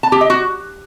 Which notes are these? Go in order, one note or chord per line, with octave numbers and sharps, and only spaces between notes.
A5
G4
D#5
F#4